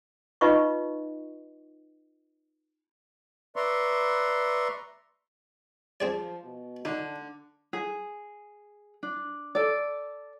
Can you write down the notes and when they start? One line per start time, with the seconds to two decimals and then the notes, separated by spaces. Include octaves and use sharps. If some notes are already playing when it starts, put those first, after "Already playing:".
0.41 D#4 F4 B4 D#5 F5 C#6
3.56 B4 D5 E5 A#5 C6 C#6
6.00 F3 C4 G#4 D5
6.43 B2
6.85 D3 D4 D#4
7.73 G#4
9.03 D4
9.55 A4 D5